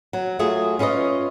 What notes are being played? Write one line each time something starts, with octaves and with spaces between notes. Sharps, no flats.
F#3
F#3 A3 F4 G#4
C#4 F4 B4 C#5 D#5